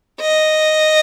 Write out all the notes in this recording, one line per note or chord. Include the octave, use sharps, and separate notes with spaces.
D#5